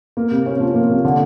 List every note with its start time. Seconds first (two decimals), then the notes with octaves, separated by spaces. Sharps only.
0.17 A#3
0.31 C3
0.46 C#4
0.60 F3
0.75 A#3
0.90 C3
1.05 D3